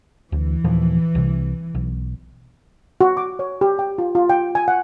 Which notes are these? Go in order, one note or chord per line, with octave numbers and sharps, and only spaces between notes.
D2 E3
D#2 A#2 F3
C2 C3
B1
F#4
D6
C#5
G4
G5
F4
F4
G5
G#5
F#5